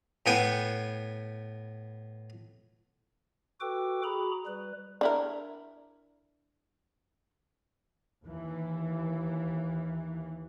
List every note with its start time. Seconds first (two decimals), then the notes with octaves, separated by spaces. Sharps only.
0.26 A2 B3 G5 G#5
3.60 F#4 A4 B4 G5 D6
4.03 F#4 G#4 A#5 B5
4.46 G3 B4
5.01 D4 E4 A#4
8.23 D#2 E3